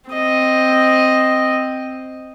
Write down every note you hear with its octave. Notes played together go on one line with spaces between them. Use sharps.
C4 D#5